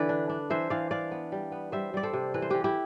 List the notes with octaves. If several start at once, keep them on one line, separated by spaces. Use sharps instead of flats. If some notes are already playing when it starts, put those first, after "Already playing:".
Already playing: D3 E3 B4 D5
D4
D4
E3 C5 E5
E3 D5 F5
D4 D5 F5
B3
G3
B3
G3 C5 E5
G3 D5
A4 C5
C3
E3 B4
C5
E3 G4 B4
E4 G4